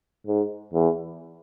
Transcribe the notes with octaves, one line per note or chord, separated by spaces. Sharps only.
G#2
E2